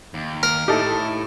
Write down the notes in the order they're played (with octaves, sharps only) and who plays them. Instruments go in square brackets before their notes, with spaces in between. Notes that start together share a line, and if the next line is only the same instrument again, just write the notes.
[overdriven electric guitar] D#2
[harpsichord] A#4
[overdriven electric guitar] A2 [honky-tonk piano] D#4 E4 A4 [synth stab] G4